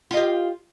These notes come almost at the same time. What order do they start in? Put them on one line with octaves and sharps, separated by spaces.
F4 D#5 G4